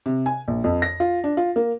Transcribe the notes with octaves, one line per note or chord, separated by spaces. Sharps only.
C3
G#5
A#1
F2
A#6
F4
D4
F4
A#3